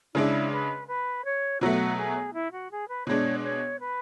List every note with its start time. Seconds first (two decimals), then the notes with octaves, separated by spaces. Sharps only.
0.15 C#3 G#3 D4 E4
0.51 B4
0.88 B4
1.25 C#5
1.61 B2 F#3 A3 F#4
1.97 G#4
2.34 E4
2.52 F#4
2.71 G#4
2.88 B4
3.07 B2 G#3 D4 C#5
3.38 D5
3.44 C#5
3.80 B4